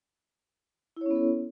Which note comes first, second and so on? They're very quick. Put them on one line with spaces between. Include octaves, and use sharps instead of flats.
E4 C#5 C#4 B3 A4